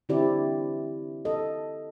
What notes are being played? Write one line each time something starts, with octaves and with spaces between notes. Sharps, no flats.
D3 C4 E4 G4 D5
A4 D#5